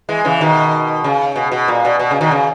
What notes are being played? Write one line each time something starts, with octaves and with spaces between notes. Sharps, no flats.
E3 G#3
C#3 E3
B2 D#3
C#3
B2
B2
A#2
B2
B2
C#3
B2 D#3
C#3